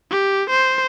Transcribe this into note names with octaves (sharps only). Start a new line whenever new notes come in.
G4
C5